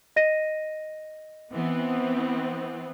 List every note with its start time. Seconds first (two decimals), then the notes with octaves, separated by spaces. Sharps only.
0.16 D#5 A#6 D#7
1.52 E3 B3 C4